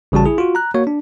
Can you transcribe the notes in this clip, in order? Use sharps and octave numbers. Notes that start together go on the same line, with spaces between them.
A1 C#3 G3 F#4 A5
E4 G#4
F4 F#4
A#5 F#6
A#3 F#4 C#5
D4